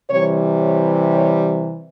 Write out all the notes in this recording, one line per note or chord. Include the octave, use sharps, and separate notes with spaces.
C3 E3 G3 C#5
C#5
C#5